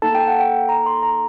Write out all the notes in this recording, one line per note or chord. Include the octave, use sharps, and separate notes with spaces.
A#3 D#4 A4 A5
G5
F#5
G5
A#5
C6
A#5